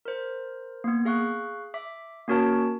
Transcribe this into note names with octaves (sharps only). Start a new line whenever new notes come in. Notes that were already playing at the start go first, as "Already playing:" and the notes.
A#4 C5
A#3 B3
G#4 F5 C#6 F#6
E5 D6 B6
A#3 C#4 F#4 A#4 C#5 A5